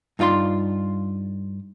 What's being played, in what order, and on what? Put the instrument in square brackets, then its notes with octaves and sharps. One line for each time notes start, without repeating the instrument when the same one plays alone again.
[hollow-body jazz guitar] G2 D#4 F4 D5 C6